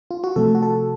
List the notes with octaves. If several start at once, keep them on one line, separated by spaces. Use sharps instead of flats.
F4
F#4
C3 F3 A3 A4
F#4
A4